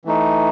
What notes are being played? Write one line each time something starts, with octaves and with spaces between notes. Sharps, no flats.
E3 A3 D#4